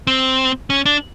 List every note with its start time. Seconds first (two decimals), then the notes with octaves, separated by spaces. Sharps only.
0.07 C4
0.70 C#4
0.86 D4